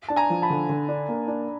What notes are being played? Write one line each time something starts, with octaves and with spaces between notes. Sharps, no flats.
D4 A5
G#5 A#5
F3
A5 B5
D3
D3
D4
A#3
D4